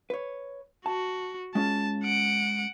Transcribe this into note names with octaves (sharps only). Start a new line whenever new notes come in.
B4 C#5
F#4 A5
G#3 C#4 F4 A5
F#5 D7